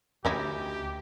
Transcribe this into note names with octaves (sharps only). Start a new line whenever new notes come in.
D2 C#4 D#4 E4 G4